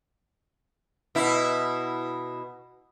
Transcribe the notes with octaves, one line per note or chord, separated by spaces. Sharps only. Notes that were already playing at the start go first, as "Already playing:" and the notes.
B2 E4